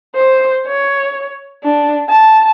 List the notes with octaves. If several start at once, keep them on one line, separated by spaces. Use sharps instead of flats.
C5
C#5
D4
A5